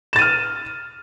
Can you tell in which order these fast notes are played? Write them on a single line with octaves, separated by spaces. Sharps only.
E7 A6 D#7 F6